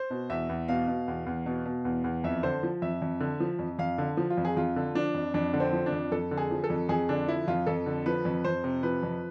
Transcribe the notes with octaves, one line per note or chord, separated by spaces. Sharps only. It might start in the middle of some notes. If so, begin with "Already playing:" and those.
Already playing: C5
B2
E2 E5
E2
B2 F5
B2
E2
E2
B2
B2
E2
E2
F2 E5
D3 C5
F3
F2 E5
F2
D3
F3
F2
F2 F5
D3
F3
F4
F2
G#4
F2 F4
D3
F3 D4
F2
F2 D4
D3
C4
F3
D4
F2
F2 A4
D3
G#4
F3
A4
F2
F2 G#4
D3 D4
F3 E4
F2 F4
F2 A4
D3
F3 B4
F2
F2 C5
C3
F3 B4
F2